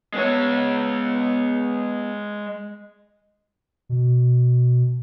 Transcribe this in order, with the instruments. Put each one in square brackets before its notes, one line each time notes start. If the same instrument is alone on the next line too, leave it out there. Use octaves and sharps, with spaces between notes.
[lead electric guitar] G#3 C#5 [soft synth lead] B3
[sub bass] B2